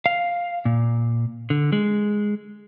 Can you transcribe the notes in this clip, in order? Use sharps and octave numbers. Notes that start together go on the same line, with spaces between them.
F5
A#2
D3
G#3